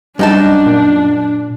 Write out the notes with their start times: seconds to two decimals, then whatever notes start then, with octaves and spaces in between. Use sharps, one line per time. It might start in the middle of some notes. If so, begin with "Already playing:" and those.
0.19 F#2 G3 D4 D#4 A5
0.66 A#2